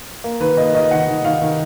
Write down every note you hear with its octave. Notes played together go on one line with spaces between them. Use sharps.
A#3
D#3 B4
A#3 D#5
D#3 D#5
D#3 F#5
D#3
D#3 F5
D#3